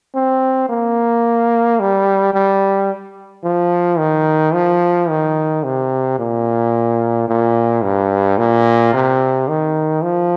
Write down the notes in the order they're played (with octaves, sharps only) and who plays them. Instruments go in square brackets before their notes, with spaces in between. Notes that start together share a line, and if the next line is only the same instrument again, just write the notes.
[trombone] C4
A#3
G3
G3
F3
D#3
F3
D#3
C3
A#2
A#2
G2
A#2
C3
D#3
F3